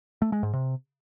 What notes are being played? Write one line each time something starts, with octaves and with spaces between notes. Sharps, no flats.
A3
G#3
G#2
C3